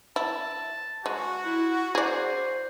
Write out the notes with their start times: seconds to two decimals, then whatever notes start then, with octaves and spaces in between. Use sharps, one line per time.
0.16 E4 A5
1.06 G#3 F#4
1.45 E4
1.95 G#4 C5 D5